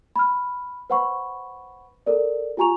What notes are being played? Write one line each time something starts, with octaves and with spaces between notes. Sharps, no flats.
B5 F6
B4 C5 F#5 B5 C#6
A4 A#4 D5
F4 G4 G#5 A#5 C#6 F7